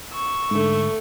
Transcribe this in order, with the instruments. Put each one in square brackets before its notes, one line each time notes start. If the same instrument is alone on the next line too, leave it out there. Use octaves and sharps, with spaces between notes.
[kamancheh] C#6 E6
[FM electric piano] G#2 D3 [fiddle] A3